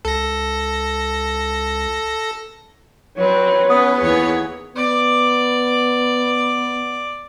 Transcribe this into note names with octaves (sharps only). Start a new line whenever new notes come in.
C#2 A4 A#6
F#3 C4 B4 C#5
B3 C#4 D#6
D#2 E3 G#4 C#5
B3 D5